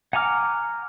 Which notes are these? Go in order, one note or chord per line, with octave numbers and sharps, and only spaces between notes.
F#5 G#5 A#5 D6 F6